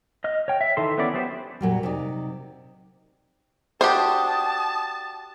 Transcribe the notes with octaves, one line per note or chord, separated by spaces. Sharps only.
D#5 F6
C#5 G5
E5
D#3 E3 A4 C6
B3 C#4 E4 D5
F#3 B3 G4 C5
A#2 F#3 G3
C3 D#4 D5
D4 F#4 G4 C5 A5 D#6